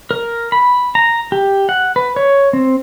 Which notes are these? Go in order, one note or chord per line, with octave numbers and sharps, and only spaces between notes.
A#4
B5
A#5
G4
F#5
B4
C#5
C4